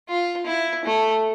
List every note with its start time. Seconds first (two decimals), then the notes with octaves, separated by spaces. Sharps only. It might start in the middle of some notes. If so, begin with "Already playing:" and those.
0.09 F4
0.47 E4
0.85 A3